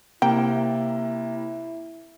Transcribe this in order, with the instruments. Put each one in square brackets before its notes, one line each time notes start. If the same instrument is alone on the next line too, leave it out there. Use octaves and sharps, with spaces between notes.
[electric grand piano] C3 A#3 [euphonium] E4 [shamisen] G5 A#5